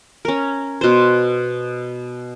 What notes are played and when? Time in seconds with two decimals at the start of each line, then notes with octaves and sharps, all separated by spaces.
0.25 C#4 A#4
0.81 B2 C5